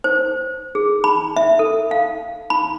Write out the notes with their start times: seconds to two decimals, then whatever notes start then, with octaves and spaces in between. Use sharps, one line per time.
0.04 C5
0.75 G#4
1.04 B5
1.36 E5
1.59 A4
1.91 F5
2.50 B5